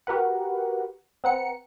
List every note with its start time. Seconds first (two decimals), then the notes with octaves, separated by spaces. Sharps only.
0.07 F#4 G4 A#4 B4 F#5
1.24 C4 B4 F#5 A#5 C#7